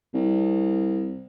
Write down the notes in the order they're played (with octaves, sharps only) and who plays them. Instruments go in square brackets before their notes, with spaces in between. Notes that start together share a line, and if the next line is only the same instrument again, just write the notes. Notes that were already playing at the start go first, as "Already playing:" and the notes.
[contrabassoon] C2